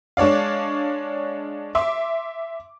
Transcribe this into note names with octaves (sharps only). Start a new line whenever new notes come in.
G#3 D4 C#5 D5 F5
E5 C6 D6